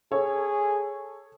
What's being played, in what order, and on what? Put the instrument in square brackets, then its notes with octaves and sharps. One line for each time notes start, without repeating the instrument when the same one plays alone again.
[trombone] G#4 [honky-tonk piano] A4 C#5